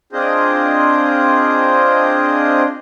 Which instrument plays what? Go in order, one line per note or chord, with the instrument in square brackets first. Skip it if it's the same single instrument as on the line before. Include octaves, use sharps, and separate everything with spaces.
[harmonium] C4 D4 F4 G#4 C5 D#5